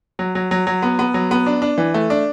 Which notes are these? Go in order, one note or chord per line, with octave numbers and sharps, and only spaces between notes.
F#3
F#3
F#3
F#3
B3
B3
F#3
B3
D4
D4
E3
A3
D4